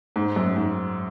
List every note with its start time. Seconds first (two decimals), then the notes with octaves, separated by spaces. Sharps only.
0.16 G#2
0.36 F#2
0.57 G#2